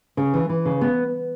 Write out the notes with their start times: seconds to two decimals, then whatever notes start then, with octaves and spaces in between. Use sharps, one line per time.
0.17 C#3
0.34 E3
0.49 E3
0.65 C#3
0.81 B3